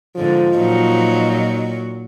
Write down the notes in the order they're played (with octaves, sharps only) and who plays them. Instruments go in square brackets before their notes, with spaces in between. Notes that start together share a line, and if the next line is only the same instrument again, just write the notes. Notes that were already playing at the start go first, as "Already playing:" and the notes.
[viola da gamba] G#2 D3 [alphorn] F3
[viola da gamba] A#2 F#3 F#4 [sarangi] D#4